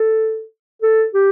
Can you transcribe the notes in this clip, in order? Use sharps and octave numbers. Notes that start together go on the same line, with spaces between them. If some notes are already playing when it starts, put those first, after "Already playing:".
Already playing: A4
A4
G4